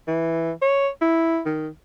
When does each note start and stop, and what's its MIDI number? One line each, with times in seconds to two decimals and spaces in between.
0.08 0.52 52
0.62 0.89 73
1.02 1.40 64
1.46 1.68 51